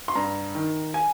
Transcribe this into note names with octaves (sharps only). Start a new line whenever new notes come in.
C6
G2 A#5
D#3
G#5